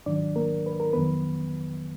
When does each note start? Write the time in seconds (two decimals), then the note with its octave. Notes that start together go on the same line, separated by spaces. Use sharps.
0.06 G#2 D#3 F#3 D4 D5
0.36 A#3 A#4
0.66 B4
0.80 A#4
0.93 F2 D#3 F#3 B3 B4